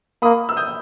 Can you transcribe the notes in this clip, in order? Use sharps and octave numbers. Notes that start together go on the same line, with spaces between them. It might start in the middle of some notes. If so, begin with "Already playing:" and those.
A#3 B5 D#6
E6
D#6 G6